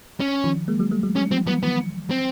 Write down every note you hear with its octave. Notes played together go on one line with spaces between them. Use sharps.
C#4
D#3 F3
G#3 A#3
F#3 G#3
G3 A3
F#3 G#3
F#3 G#3 C#4
F3 G3 C4
E3 F#3 B3
D#3 F3 B3
C4